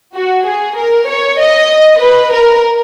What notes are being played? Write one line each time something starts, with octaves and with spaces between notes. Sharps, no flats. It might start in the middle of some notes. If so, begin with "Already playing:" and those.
F#4
G#4
A#4
C#5
D#5
B4
A#4